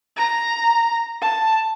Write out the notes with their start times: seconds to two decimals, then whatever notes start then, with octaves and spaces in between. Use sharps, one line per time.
0.16 A#5
1.22 A5